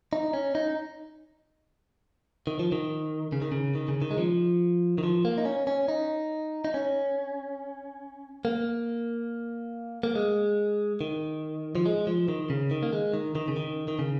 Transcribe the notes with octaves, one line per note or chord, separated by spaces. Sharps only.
D#4
C#4
D#4
D#3
F3
D#3
C#3
D#3
C#3
D#3
C#3
D#3
G#3
F3
D#3
F3
A#3
D#4
C#4
C#4
D#4
D#4
C#4
A#3
A#3
G#3
D#3
F3
G#3
F3
D#3
C#3
D#3
A#3
G#3
D#3
D#3
C#3
D#3
D#3
C#3